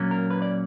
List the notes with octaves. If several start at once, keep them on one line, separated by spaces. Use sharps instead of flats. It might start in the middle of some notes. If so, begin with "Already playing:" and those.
Already playing: A#2 F#3 A#3 C#4
A#4
B4
D5